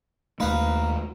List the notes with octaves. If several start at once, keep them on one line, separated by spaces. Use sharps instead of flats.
D#2 A3 D#4 B4 F5